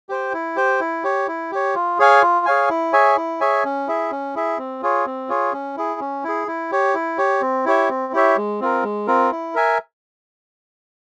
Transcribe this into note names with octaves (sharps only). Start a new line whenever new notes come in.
G4 C5 G5
E4
G4 C5 G5
E4
G4 C#5
E4
G4 C#5
F4
G#4 C#5 F5 G#5
F4
G#4 C#5 F5 G#5
E4
G#4 C#5 E5 G#5
E4
G#4 C#5 E5 G#5
C#4
E4 G#4 E5
C#4
E4 G#4 E5
C4
F4 G#4 C#5
C4
F4 G#4 C#5
C#4
E4 G#4
C#4
E4 G#4
E4
G4 C#5
E4
G4 C#5
C4
E4 G4 C#5 E5
C4
E4 G4 C#5 E5
G#3
C4 F4 A#4
G#3
C4 F4 A#4
E4
A#4 E5 G#5